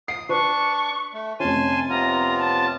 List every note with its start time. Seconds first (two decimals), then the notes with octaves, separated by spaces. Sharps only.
0.08 D#6 C7
0.29 D4 B4 C#6
1.14 A3
1.40 F1 C#4 G#5 A5 C6 D#7
1.89 C3 B3 F4 A#5
2.38 A5